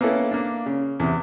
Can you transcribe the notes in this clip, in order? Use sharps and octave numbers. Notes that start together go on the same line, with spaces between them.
A#3 B3 C#4 E4 A4
A#3 D4
C#3
E2 C3